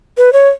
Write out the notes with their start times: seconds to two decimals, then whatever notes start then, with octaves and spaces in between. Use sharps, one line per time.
0.17 B4
0.33 C#5